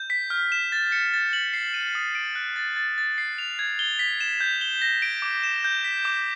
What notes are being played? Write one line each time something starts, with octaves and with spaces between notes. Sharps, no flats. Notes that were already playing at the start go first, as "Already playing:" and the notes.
Already playing: G6
B6
F6
E7
A6
C#7
A6
F#7
C7
D#7
D#6
D7
F#6
A6
A6
A6
C7
F7
G#6
G7
B6
E7
G6
G7
A#6
D7
D6
E7
G6
B6
D6